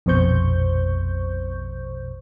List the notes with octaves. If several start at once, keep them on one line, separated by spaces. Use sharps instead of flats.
A#1 F2 B2 C5 C#6 G6